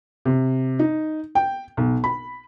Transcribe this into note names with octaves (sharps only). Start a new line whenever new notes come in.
C3
D#4
G5
B1
B5